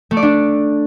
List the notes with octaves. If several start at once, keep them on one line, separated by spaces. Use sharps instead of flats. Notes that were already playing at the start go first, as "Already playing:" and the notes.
A3
D5
D4